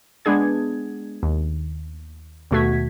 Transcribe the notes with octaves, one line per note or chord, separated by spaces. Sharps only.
G#3 B3 D4 G#4 G#6
D#2
D#2 B2 A3 F#4 G#6 B6